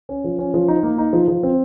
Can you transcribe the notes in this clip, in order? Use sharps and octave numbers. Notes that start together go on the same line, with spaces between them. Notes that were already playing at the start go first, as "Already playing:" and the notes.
C#4
F3
C#4
F3
D#4
A#3
D#4
F3
F3
C4